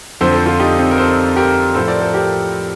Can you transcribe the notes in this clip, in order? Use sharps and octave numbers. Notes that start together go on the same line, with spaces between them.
F2 D3 F3 A4 C5
A4 C5
F4 A4
D#4 G4
C4 D#4
A#4
A4 C5
G4 A#4
A2 F3 A4 C5
A#4 D5
A4 C5
G4 A#4